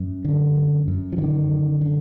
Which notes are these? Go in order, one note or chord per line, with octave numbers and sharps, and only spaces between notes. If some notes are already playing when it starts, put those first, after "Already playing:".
Already playing: F#2
D3
F#2
F#2
F3
D3 D#3
F#2
D3